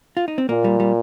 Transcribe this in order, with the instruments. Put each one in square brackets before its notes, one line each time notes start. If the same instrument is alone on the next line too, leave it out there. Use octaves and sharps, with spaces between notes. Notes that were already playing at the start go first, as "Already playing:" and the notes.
[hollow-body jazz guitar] F4
D#4
C4
[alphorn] A#2 [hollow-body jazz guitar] A#3
[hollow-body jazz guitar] G3
G3